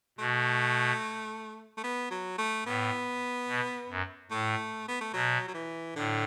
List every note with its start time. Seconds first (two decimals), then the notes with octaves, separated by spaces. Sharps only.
0.18 B2 A3
1.77 A3
1.84 B3
2.11 F#3
2.38 A3
2.66 A2 B3
3.48 B2
3.89 F#2
4.31 A2 A3
4.88 B3
5.01 A3
5.13 B2 F#3
5.48 F#3
5.54 E3
5.96 A2 D3